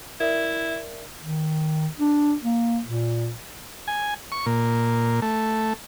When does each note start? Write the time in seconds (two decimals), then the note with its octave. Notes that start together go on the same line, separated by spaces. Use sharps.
0.20 E4 A#4 D5 E5
1.23 D#3
2.00 D4
2.43 A#3
2.85 A#2
3.88 G#5
4.32 C#6
4.46 A#2
5.22 A3